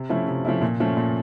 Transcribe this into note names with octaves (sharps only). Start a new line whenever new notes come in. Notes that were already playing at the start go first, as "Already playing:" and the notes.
Already playing: C3
F3 A3 C#4 E4
C3
F3 A3 C#4 E4
A#2
F3 A3 C#4
A#2